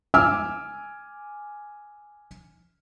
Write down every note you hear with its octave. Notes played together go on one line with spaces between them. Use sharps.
G#5 D6 E6 F6